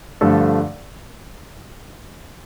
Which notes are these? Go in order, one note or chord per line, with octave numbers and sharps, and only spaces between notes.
G2 D3 F3 A3 A4